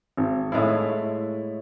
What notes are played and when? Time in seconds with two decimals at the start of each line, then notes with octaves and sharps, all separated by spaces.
0.17 G#1
0.52 A2 G#3 A3 E4 F5